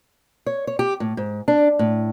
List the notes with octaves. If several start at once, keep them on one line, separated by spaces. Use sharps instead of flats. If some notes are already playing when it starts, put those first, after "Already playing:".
C#5
C#5
G4
A2
G#2
D4
A2